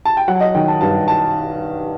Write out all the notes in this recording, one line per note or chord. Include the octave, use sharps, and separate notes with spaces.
A5
G5
F#3 F#5
D#5
D#3 G5
A5
G2 A5
A5